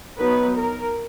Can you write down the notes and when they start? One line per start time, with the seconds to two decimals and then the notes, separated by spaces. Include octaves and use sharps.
0.19 F#3 B3 D#4 B4
0.57 A#4